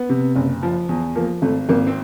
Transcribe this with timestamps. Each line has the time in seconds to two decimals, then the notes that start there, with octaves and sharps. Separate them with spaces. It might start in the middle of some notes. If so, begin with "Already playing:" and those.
Already playing: B3
0.09 C3
0.36 F#1
0.63 F3
0.89 E2
1.16 F3 A#3
1.42 G#1 A3
1.69 G#1 A#3
1.87 C4